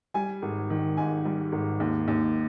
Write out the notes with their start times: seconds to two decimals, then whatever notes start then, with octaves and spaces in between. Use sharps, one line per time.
0.14 G3 G#5
0.42 G#1
0.70 D#3
0.97 G#2 G#5
1.25 G3
1.52 G#1
1.80 D#2
2.08 D#2